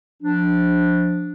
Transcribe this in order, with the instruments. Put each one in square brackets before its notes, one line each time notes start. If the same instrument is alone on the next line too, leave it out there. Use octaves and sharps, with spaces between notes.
[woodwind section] F3 D4